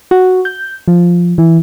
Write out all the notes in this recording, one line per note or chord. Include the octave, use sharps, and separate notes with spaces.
F#4
G6
F3
E3